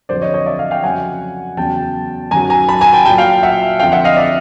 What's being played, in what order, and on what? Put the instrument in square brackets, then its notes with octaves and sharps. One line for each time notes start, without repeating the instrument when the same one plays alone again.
[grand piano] F2 D3 F#3 C5 D5
C#5 D#5
C#5 D#5
D5 E5
D#5 F5
F5 G5
F2 C#3 F#3 F#5 G#5
E2 C#3 F#3 G5 A5
F#2 D#3 F#3 G#5 A#5
G#5 A#5
A5 B5
G#5 A#5
G5 A5
A#2 F#3 G5 A5
F5 G5
E5 F#5
F2 D3 F3 F5 G5
E5 F#5
D#5 F5
D5 E5